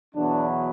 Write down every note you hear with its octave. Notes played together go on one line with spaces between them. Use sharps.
E2 B2 F#3 B3 D4